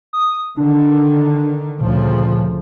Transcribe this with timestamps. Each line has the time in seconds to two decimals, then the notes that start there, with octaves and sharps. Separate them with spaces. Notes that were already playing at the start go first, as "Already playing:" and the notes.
0.13 D#6
0.57 D3 D#3 D4
1.81 D2 A#2 C#3 F3